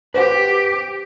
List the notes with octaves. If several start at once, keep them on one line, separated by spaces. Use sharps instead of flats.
G4 B4 C5 F#5